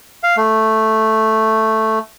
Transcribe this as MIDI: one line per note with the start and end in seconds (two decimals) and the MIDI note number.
0.23 0.36 77
0.37 1.99 57